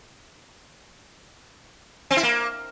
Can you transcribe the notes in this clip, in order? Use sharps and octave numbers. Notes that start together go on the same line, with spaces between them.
C4
E4
A#3